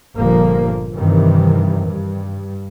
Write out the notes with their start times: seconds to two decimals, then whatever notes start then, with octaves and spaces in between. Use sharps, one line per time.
0.17 G1 A#2 F3 A#3
0.95 G2 C3 D#3 E3
1.83 G2